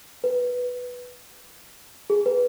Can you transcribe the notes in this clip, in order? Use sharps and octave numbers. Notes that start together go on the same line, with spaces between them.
B4
G#4
B4